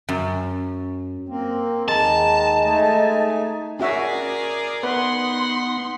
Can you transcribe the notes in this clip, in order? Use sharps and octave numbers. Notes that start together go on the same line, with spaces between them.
F#2
A#3 C4
D#2 D#3 G#3 A5 A#5
A3 D#4 G#5
C#4 F#4 G#4 A#4 D5 E5
B3 D#4 B4 F#5 C6